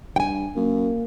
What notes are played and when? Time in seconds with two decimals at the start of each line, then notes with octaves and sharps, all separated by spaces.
0.16 G2 G5 G#5
0.56 F#2 A#3